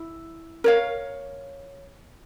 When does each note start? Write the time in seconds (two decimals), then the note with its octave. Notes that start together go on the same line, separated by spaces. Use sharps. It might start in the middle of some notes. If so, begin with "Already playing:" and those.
Already playing: E4
0.64 A#4 C#5 F5